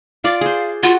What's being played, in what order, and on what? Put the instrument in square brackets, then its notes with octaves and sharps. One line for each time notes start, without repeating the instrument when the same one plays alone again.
[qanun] F4 D5 [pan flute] F5
[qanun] G#4 C5
[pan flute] F4 [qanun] F#4